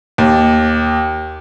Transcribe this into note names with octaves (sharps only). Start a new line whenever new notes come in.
D#2